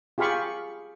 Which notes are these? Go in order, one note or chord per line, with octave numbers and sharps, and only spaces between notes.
F4 G4 G#4 F5 B5 C#6